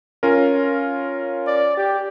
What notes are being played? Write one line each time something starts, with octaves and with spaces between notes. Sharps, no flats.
C#4 F4 A#4
D5
G4